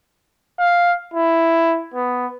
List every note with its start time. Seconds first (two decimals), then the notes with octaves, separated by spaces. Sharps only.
0.59 F5
1.14 E4
1.94 B3